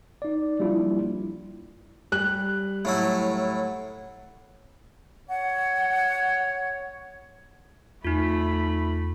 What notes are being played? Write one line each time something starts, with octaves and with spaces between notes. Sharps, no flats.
D#4 D5
F3 G3 A#3 D4 E4 F4
G3 F#6
A2 F#3 E4
C#5 F#5
E2 A3 D#4 F4 B5